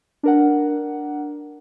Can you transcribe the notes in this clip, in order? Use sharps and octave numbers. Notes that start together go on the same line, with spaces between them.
D4 A#4 F#5